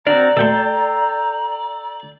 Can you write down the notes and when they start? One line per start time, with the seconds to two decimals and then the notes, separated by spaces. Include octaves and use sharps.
0.07 C4 D4 F#4 A#4 D5 A#5
0.37 B2 A3 A4 G5 C6